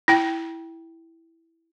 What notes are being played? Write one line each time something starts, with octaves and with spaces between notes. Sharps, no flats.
E4 G5